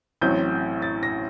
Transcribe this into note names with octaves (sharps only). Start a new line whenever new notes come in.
A1 A2 F#3 C4 G6
A6
A#6